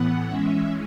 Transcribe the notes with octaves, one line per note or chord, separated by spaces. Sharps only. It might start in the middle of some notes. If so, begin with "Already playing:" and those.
Already playing: A2 E3 B3 F#5
E3 G#3 C#4 E5